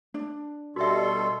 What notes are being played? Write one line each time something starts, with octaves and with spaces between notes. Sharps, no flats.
D4
B2 G3 F#4 A4 E5 C6